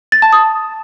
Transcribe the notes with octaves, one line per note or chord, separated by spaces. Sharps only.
A6
A5
D#6